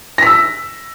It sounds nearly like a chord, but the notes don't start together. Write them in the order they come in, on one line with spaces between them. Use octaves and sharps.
A#6 B6 E6